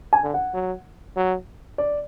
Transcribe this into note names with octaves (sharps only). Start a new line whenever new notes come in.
G#5
D3
F#5
F#3
F#3
D5